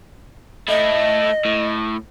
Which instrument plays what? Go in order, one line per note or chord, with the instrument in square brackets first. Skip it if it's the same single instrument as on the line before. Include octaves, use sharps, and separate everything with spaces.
[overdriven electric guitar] A3 E4 [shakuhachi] D#5
[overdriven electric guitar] A2